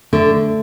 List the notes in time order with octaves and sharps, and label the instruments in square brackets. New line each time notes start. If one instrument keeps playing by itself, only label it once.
[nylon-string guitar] D3 [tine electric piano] A3